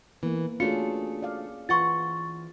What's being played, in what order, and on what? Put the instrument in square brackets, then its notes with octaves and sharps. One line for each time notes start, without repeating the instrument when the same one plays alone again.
[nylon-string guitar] E3 [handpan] A#3 B3
[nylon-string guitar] A3 D4 F4 [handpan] C#4 G#4 [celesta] F#4 C#7
[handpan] D5 F5
[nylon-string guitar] E3 F#5 [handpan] F4 [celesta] C6 C#6 A6